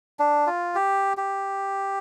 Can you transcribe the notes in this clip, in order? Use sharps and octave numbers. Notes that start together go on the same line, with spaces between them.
D4
F4
G4
G4